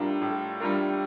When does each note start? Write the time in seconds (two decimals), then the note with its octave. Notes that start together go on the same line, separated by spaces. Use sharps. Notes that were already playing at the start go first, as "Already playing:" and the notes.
Already playing: A2 G3 D4 F4 A#4
0.21 A2
0.60 G3 D4 F4 A#4